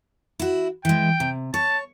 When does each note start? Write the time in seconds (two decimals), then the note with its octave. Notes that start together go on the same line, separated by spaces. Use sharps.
0.39 E4 F#4
0.85 E3 G#3 G5
1.20 C3
1.54 C#5 A5